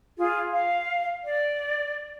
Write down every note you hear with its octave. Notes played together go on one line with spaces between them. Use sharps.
F4 G#4
F5
D5